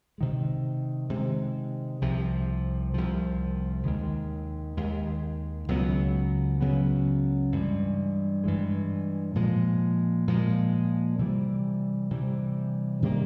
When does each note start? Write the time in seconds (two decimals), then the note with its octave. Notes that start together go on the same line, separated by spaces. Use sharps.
0.18 C3 D#3 G#3
1.10 C3 D#3 G#3
2.01 C2 C3 F3
2.94 C2 C3 F3
3.85 D#2 D#3 G#3
4.77 D#2 D#3 G#3
5.68 C#2 C#3 F#3 B3
6.61 C#2 C#3 F#3 B3
7.52 G2 E3 G#3
8.44 G2 E3 G#3
9.35 A#2 F3 G#3
10.28 A#2 F3 G#3
11.19 C3 E3 G3
12.11 C3 E3 G3
13.02 C3 D#3 G3 A#3